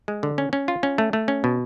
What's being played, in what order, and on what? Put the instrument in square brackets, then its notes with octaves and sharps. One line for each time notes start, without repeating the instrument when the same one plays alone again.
[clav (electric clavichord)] G#3
D3
C#4
C#4
F4
C#4
A3
A3
C#4
B2